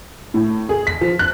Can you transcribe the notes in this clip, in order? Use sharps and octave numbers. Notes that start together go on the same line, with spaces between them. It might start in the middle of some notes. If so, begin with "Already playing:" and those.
A2
G#4
B6
F3
F#6